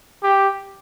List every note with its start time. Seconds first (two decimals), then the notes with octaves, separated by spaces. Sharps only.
0.23 G4